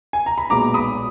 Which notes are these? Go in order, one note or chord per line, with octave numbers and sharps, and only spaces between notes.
G#5
A#5
B5
B1 A#2 G#3 B3 A#5 D6
B5 D#6